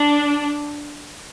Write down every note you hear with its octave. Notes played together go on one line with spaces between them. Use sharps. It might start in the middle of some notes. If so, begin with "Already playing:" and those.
Already playing: D4